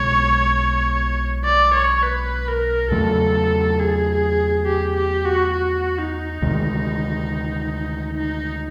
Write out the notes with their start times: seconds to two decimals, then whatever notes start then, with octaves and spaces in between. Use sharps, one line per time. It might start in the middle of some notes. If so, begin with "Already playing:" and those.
Already playing: B1 B2 G#3 C#5
1.45 D5
1.74 C#5
2.03 B4
2.48 A#4
2.91 E2 C#3 F#3 A3 A4
3.79 G#4
4.66 G4
4.96 G4
5.25 F#4
5.54 F#4
5.98 D#4
6.42 D2 C3 D#3 G#3
8.18 D#4